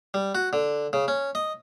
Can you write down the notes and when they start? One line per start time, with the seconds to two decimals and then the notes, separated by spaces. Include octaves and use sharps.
0.14 G3
0.35 F#4
0.53 D3
0.93 C#3
1.08 C#4
1.35 D#5